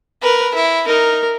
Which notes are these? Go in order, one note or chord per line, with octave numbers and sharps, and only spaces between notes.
A#4 B4
E4
D#4 A#4